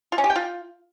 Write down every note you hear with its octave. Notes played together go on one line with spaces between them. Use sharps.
F4
C#4
G4
G5
F4